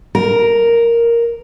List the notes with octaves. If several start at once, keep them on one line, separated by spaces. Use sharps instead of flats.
A#4